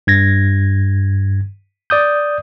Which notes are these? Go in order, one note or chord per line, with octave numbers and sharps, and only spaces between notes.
G2 G#6 A#6
D5 D#6 G6